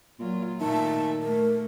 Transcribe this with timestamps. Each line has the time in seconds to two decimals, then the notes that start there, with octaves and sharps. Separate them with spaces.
0.20 A#2 F#3 F4
0.61 A#2 D#3 A3 E5 A5
1.22 A3 A#4